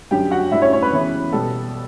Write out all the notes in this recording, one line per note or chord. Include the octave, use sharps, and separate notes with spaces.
F#2 D3 G3 D4 G4 G5
F#4 F#5
A2 G3 D4 E4 E5
C#4 C#5
C#4 C#5
B4
C#3 E3 B3 E4
B2 G3 B3 A4